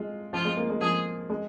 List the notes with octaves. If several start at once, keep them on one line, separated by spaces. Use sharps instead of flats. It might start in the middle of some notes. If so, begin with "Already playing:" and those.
Already playing: G#3 F4
F3 F4
G#3
A#3
G#3
F3 G#4
G#3